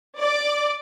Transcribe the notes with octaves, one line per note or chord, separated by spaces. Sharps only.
D5 D6